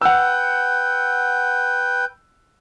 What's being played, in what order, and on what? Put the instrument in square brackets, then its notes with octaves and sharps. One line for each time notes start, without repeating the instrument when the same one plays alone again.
[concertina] B4 G5 [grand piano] F#5 E6